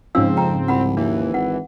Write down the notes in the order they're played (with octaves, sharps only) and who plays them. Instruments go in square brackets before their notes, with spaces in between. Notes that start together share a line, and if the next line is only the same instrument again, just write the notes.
[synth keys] G#2 C#3 F3 [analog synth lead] C4 [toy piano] D4 F5 E6
[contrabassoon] F2 [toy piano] G5 A#5
[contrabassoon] C2 [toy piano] F#5 B5
[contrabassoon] D#2 [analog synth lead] E3 [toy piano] D4
[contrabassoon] G#1 [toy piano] F#5